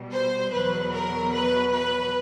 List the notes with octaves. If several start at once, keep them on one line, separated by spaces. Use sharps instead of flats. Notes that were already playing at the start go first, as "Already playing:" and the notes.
Already playing: B2 G3
C5
E2 B2 F#3 B4
A#4
B4
B4